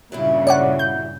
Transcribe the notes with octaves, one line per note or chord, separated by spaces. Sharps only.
G2 A#2 C#3 F#3 G3 E4
C#5 D5 F#5
G6